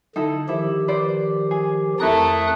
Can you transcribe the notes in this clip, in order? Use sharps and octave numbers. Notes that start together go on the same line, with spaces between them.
D3 D#4 E4 A4
D#3 F3 E4 G4
B4 C5 D5
G#4
F2 A3 E4 A#4 D#6 F#6